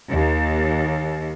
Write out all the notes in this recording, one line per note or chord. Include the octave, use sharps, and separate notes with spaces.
D#2